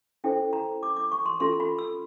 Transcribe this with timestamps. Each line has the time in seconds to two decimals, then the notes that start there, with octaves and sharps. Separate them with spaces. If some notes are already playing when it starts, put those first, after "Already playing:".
0.24 C#4 E4 A4 C5 G5
0.53 A#5
0.83 D6
0.96 D6
1.12 C#6
1.26 C6
1.40 C#4 F4 A4 C6
1.60 B5
1.79 E6